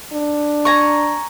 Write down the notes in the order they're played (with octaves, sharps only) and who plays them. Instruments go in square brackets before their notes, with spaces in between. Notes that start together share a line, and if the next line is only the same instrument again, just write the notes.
[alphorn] D4
[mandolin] G#5 A#5 C#6